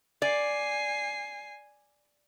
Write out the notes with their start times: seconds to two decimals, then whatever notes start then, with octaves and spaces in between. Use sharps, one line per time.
0.22 D5 G#5 C7